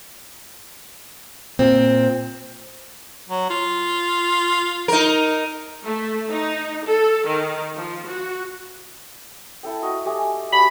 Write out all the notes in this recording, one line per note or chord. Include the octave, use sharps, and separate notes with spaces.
A#2 C4
F#3
F4
D#4 A#4
A3
D#4
A4
D#3
F3
F#4
E4 A4 G5
F#4 D#5
A3 G4 G#5
G3 F#4 A5 B5